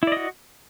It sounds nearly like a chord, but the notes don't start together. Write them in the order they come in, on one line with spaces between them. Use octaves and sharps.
E4 D5 D#5 F#4